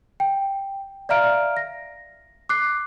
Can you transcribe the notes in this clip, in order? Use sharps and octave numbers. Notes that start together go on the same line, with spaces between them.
G5
D5 E5 F5 A#5 F6 D7
A#6
D6 F#6 C7